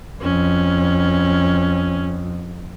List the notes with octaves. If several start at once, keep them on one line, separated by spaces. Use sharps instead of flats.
F2 C#4